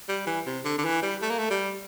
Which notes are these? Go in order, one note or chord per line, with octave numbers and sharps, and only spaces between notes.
G3
E3
C3
D3
D3
E3
G3
A3
A#3
A3
G3